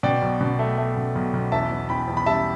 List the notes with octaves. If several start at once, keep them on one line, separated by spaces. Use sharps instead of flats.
B2 D5 G5
B1
B2
A3
A3
B2
B1
B1
E2 E5 A5
E2
E2 G5 B5
E2
B5
G3 E5 A5